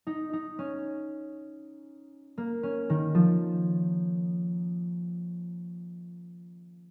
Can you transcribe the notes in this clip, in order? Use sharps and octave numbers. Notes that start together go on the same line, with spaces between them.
D#4
D#4
C#4
A#3
C#4
D#3
F3